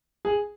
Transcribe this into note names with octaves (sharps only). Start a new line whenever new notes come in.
G#4